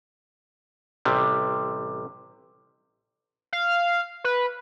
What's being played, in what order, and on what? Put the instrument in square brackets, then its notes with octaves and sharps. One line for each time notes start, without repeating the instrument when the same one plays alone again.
[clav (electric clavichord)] A1 C3 G3
[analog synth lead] F5
B4